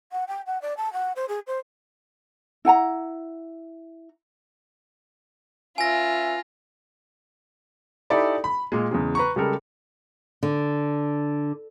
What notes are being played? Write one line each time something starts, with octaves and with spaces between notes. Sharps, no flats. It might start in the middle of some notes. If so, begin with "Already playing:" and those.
F#5
G5
F#5
D5
A5
F#5
C5
G#4
C5
E4 F#5 G#5 A#5
C#4 F4 B4 E5 G#5 A#6
D#4 E4 G4 A4 D5 B5
B5
A#2 G#3
E2 C#3 G#3
B4 A#5 C#6
C#3 G3 G#3 A4 A#4
D3